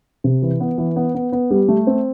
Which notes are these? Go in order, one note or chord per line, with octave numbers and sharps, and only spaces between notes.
C3
E3
B3
E3
B3
B3
B3
G3
A3
C4